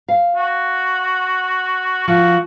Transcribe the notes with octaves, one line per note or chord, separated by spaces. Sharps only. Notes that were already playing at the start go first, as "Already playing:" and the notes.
F5
F#4
F3 F#4